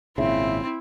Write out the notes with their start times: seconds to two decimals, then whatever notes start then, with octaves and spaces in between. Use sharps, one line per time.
0.18 G#1 A#2 C#3 C4 E4 E5